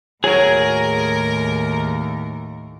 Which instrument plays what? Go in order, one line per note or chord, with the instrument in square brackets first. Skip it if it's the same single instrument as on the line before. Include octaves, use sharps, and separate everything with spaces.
[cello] D#2 A2 [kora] F#3 [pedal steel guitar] G#4 G#5 [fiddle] A#4